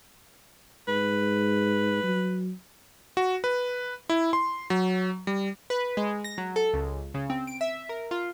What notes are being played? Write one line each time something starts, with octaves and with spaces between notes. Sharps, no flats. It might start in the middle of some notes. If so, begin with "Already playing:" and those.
G#2 B4
F#3
F#4
B4
E4
C6
F#3
G3
B4
G#3
A#6
F#3
A4
C#2
C#3
C4
D7
E5
A#4
F4